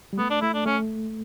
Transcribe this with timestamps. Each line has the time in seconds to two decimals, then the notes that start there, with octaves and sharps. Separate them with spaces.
0.13 G3
0.18 A3 B3
0.30 D4
0.42 A3 E4
0.54 D4
0.65 A3 C#4